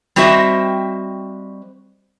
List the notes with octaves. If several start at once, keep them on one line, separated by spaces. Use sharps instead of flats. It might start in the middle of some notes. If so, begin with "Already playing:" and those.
G3 C4 F#4 C5 D#5 E5